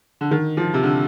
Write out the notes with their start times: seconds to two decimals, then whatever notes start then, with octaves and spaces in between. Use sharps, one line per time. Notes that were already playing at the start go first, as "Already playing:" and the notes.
0.21 D3
0.31 D#3
0.57 F3
0.74 C3
0.83 D3